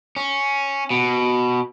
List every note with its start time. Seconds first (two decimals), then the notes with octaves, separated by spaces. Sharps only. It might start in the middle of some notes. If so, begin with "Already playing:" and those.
0.16 C#4
0.90 B2